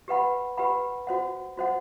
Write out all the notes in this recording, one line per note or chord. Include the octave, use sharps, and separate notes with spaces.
G4 B4 F#5 B5
G4 B4 F#5 B5
F#4 C5 F#5
F#4 C5 F#5